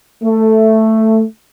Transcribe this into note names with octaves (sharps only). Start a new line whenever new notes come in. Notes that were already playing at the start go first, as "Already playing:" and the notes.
A3